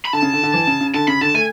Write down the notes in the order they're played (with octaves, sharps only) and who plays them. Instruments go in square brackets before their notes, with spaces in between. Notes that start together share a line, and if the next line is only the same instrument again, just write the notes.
[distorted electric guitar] B5
[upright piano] D3 [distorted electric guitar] A5
[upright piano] C#3
D3
D3
E3
C#3
C#3
[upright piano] D3 [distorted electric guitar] A5
[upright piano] C#3 [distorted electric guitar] B5
[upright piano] D3 [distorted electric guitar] A5
[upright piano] A3 [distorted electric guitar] G#5